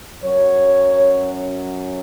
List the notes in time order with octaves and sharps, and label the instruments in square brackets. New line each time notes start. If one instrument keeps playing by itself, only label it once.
[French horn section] F#2 F#3 C#4 C#5